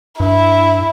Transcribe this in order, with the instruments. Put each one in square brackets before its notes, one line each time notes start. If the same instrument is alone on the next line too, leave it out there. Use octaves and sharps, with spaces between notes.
[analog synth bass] G2 [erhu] E4